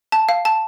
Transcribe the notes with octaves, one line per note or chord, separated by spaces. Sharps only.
A5
F5
A5